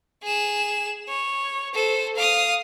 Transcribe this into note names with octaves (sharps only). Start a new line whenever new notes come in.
G#4 E7
C#5
A4 C5
F5 D#6